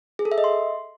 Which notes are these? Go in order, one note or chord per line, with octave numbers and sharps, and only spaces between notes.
G#4
A4
E5
D#5
C6